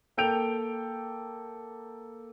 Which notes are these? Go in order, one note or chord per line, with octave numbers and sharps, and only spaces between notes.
A#3 A4 G5 G6 D7 F7